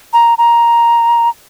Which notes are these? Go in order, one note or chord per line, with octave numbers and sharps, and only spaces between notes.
A#5
A#5